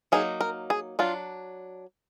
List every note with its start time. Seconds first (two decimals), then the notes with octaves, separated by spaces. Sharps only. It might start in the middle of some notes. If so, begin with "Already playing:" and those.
0.12 F#3 A#3 D#4 G#4
0.41 A#4
0.70 G#4
0.99 F#3 D4 F4